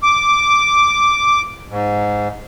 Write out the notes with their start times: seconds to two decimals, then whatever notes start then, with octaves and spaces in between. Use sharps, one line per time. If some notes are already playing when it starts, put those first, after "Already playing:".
0.03 D6
1.69 G#2